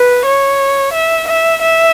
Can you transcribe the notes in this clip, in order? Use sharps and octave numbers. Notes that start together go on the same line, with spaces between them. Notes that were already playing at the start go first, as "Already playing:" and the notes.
Already playing: B4
C#5
E5
E5
E5